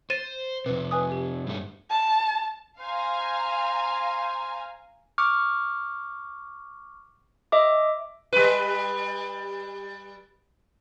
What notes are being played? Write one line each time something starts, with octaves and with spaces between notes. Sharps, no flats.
C5 A6 D#7 E7
F2 C3 B4
B4 G#5 D#6
G4
G2 A3
A5
C5 F5 G#5 A#5
C#6 D6 F6
D#5 E5 D6
G3 B4